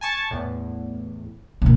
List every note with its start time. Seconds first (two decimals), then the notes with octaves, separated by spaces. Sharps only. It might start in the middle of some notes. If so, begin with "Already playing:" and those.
0.01 G#5 A5 C#6
0.31 E2 A2
1.62 A#2 D3